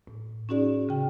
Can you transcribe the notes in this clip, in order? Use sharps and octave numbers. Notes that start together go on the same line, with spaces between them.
A2
C#4 D#4 F#4 G#4 D5
C#3 G5